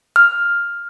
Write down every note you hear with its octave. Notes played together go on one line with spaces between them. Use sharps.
F6